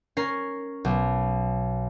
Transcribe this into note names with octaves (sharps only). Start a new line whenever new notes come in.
C#4 A#4 C7
B1